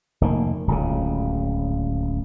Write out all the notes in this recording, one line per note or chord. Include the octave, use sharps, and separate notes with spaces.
F1 D#3 A#3
D1 C#2 C#3